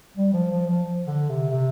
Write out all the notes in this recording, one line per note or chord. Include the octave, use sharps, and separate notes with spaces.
G3
F3
F3
F3
D3
C3
C3